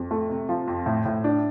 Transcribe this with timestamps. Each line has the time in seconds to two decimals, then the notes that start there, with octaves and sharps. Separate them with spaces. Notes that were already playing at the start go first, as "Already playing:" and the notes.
Already playing: F2
0.11 A3
0.30 C3
0.49 F3
0.68 F2
0.86 A2
1.06 A2
1.24 D4